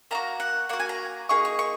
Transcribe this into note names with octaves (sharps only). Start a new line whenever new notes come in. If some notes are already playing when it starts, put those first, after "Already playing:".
A#3 D#4 F#4 A#5
F#5
A#3 F#4 F#5
G#5
A#5
A#3 D#4 G#4 C#6
C#6
C#6